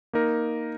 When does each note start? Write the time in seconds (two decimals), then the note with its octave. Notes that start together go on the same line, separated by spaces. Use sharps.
0.13 A#3 D#4 A#4